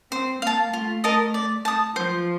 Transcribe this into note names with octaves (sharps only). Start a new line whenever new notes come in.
C4 C5
A#3 F5 A5
A3 F4
A#4 D#5 A5
D5
A5 D#6
F3 C5